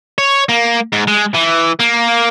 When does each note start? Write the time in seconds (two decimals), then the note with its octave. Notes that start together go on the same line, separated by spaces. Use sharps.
0.18 C#5
0.49 A#3
0.93 G#2
1.08 G#3
1.34 E3
1.79 A#3